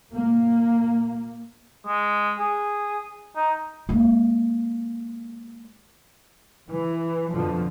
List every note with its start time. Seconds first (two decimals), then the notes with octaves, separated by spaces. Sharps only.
0.11 A#2 A#3
1.87 G#3
2.39 G#4
3.36 D#4
3.89 G#3 A#3
6.69 E3
7.30 F2 B2 D3 F3